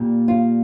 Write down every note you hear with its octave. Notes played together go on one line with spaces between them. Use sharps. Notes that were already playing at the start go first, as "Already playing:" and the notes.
Already playing: A#2 G3 A#3
F4